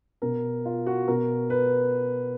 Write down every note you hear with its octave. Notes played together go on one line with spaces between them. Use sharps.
B2 A#4
F4
F#4
B2 A#4
B4